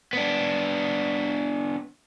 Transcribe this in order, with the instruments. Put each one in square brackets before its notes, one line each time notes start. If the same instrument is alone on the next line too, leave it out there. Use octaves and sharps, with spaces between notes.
[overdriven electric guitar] B3 D4